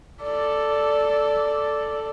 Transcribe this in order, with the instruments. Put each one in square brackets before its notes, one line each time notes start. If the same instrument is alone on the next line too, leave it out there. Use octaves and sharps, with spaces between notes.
[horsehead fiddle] A4 D5